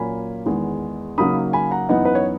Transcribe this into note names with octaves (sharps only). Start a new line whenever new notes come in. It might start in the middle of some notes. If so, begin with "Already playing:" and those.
Already playing: A#2 F#3 A#3 C#4 G#5 B5
E2 D#3 G#3 B3
C#3 F#3 A#3 D#4 B5 D#6
G#5 B5
F#5 A#5
F#2 E3 B3 D#4 D#5 F#5
B4
C#5